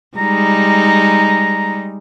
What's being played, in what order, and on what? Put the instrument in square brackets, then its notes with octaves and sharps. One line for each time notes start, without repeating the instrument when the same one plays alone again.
[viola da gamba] G3 G#3 D#4 [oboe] A#5